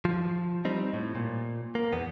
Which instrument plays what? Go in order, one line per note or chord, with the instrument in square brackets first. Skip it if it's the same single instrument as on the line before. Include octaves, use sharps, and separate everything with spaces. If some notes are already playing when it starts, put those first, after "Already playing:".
[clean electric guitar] F3
G3 C4 D#4
A2
A#2
A#3
E2 B3